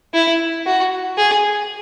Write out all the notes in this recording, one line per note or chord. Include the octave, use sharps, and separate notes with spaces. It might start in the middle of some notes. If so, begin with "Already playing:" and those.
E4
F#4
G#4